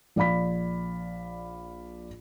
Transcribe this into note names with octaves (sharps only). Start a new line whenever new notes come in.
A#1 D5 F5 B5 B6